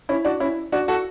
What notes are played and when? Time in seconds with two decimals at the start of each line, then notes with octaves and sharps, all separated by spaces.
0.09 C#4 E4
0.25 D4 F#4
0.40 C#4 E4
0.72 D4 F#4
0.88 F#4 A4